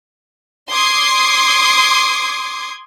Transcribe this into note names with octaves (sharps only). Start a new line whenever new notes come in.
C6 D6 D#6 G#6 C7